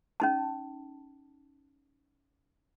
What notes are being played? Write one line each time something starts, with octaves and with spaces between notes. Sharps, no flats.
C#4 D#4 A5